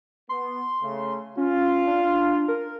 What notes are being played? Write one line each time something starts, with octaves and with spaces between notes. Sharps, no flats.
B3 C6
C#3 A3
C#4 F4
D4
A#4